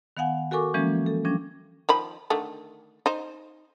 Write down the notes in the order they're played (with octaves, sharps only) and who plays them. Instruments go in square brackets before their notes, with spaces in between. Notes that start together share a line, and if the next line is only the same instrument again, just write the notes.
[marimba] D#3 B3 F5 F#5 G#5
F#4 A4 A#4 G#5 C#6 D6
E3 F3 G#3 A#3 C#4
A4
F3 G3 C#4 D4
[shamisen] D#3 F3 B5
D3 D#3 A3
D#4 C5